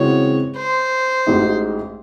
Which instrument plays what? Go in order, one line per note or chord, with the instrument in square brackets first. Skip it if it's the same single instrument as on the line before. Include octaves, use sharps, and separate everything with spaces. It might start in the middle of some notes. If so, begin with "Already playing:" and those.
Already playing: [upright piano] C#3 E3 G#3 C4 F#4 [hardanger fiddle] C#5
[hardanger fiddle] C5
[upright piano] A1 A2 G#3 D#4 F#4